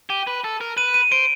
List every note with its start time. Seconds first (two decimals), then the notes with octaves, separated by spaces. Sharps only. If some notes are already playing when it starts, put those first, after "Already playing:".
0.10 G4 D#7
0.27 B4
0.44 A4
0.61 A#4
0.77 B4 D#7
0.94 D#7
1.12 C5 D7